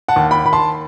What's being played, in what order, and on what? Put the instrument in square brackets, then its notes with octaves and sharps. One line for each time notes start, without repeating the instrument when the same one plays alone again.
[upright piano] F#5 A5
D#2
G5 B5
D#2 B5
A5 C6